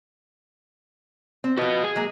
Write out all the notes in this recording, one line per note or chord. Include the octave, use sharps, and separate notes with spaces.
C4
F3 F#4 B4 D#5
G#4
F#3 G#3 A#3